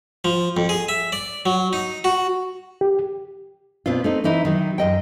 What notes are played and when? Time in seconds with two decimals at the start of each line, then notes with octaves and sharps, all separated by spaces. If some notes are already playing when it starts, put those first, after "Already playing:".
0.25 F3
0.57 F2
0.69 G#4
0.89 E5
1.12 D5
1.46 F#3
1.73 D#4
2.04 F#4
2.81 G4
3.86 B2 C4 D4 F4
4.04 A3 C4 D#4
4.24 E3 C4 D#4 E4
4.45 D#3 F#3
4.78 F#2 D#5 G5